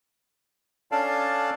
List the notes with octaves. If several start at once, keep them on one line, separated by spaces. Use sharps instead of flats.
C#4 D4 A4 D5 F5 A5